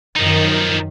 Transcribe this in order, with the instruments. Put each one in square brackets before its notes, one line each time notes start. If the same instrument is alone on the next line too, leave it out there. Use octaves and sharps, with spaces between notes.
[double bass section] F#2 D#3 [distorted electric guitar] F3 D#4